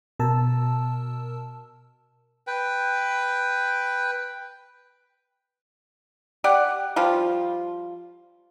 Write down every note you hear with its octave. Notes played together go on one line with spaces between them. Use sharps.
B2 A#4 A5 E6
B4 G5
G4 D5 F#5
F3 G3 F4